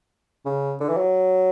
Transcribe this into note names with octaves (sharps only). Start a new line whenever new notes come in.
C#3
D3
E3
F#3